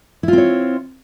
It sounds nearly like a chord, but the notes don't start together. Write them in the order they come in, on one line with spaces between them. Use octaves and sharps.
E4 F4 C4 C#5